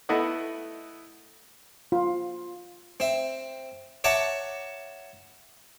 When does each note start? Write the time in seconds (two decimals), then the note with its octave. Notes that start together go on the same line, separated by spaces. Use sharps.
0.09 A3 B3 E4 D#5 F#5
1.92 F4
3.00 C4 E5
4.04 C#5 E5 F#5 A5 A#5 D6